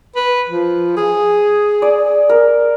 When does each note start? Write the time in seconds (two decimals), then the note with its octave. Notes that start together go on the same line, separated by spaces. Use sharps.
0.16 B4
0.49 F3
0.97 G#4
1.82 D5
2.29 A#4